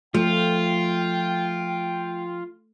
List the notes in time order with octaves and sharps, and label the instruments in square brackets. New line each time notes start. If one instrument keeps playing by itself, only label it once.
[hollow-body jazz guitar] F3 [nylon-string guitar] A3 [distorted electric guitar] F4 [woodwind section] G5